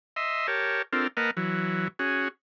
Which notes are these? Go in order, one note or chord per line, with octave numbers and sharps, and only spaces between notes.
D#5 E5 C6
G4 A#4 C#5 A5
C4 D4 F4 A4 A#4
A#3 A#4 B4 D#5 F#5 A5
E3 F#3
C#4 F#4 G#4